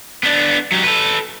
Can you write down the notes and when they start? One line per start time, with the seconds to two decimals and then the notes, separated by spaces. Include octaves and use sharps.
0.23 B3 D4
0.72 F#3 G4
0.83 A4 B4